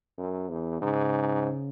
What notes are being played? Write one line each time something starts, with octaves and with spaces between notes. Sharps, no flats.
F#2
E2
G#2 C#3